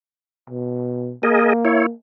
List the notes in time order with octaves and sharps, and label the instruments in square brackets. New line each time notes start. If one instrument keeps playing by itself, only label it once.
[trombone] B2
[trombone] A#3 [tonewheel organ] G#4 A#4 D#5
[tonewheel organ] E4 C#5